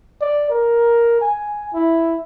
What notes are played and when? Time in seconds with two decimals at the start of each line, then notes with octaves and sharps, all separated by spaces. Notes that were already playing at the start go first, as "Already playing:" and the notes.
0.21 D5
0.50 A#4
1.21 G#5
1.74 E4